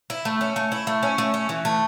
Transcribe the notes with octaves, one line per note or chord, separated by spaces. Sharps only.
E4
A3
C#4
A3
E4
A3
C#4
A3
C#4
E3
A3